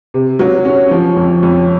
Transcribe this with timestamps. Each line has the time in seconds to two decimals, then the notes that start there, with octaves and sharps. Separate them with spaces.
0.14 C3
0.39 F#3
0.65 C#4
0.91 F3
1.16 F2
1.43 F2